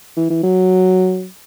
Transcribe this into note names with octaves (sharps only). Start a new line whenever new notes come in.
E3
E3
F#3